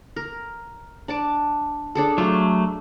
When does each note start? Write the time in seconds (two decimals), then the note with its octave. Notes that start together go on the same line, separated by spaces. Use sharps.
0.16 A#4
1.08 D4 A5 D6
1.95 D4 G#4 A4
2.18 F#3 A3 F4